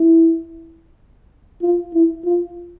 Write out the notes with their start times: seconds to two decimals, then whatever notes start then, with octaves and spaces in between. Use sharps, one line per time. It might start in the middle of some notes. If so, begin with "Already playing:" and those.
Already playing: E4
1.62 F4
1.94 E4
2.25 F4